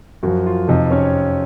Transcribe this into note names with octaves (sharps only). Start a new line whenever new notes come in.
F#2 F3 F#4
F4
F2 C3 F3 D#4 D#5
C#4 C#5